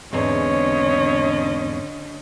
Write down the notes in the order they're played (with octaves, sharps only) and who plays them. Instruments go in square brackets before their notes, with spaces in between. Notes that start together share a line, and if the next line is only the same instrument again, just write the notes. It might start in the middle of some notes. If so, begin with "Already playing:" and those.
[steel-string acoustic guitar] E2 G#2 C4 [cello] D3 C#4 [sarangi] C#5 [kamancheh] D#5